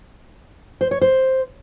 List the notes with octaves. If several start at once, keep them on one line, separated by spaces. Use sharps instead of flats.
C5
C#5
C5